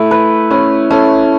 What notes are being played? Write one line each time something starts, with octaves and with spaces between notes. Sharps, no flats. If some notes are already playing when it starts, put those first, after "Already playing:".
Already playing: A3 E4
B4
C#4 B4
A3 C#4